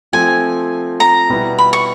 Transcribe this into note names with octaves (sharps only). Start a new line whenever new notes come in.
F3 A3 C4 G#5
A#5
B2 G3 B3 E4
B5
C#6